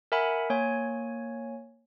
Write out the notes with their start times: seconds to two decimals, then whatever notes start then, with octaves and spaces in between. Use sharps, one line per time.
0.12 A#4 E5 F#5 G#5 B5
0.50 A#3 C#5 G#5